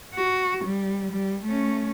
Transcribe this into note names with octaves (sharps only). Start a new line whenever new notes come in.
F#4
G3
G3
A3 C#4